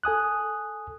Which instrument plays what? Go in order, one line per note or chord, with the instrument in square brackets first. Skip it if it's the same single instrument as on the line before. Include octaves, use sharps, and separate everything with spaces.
[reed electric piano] A4 G#5 D#6 F#6